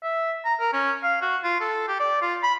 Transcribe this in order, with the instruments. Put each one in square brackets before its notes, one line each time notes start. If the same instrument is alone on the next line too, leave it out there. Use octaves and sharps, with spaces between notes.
[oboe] E5
A#5
A#4
C#4
F5
F#4
F4
A4
G4
D5
F4
B5